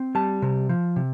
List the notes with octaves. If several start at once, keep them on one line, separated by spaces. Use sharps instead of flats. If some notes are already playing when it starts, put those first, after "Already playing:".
Already playing: C4
G3 A5
C3
F3
C3